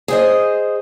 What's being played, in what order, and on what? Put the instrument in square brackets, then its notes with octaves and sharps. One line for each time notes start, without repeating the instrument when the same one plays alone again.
[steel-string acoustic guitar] G#4 C5 D#5